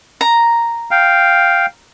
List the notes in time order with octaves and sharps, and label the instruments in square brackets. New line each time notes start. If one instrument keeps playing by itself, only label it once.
[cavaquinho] A#5
[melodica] F5 G5